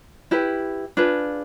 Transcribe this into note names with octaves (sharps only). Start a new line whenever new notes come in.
E4 G4 B4
D4 F4 G#4 B4